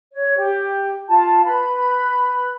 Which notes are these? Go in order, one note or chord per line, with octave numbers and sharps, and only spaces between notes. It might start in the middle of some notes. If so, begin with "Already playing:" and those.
C#5
G4
F4 A5
B4 B5